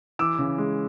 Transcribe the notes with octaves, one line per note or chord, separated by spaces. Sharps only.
E3 D6 E6
C#3
G#3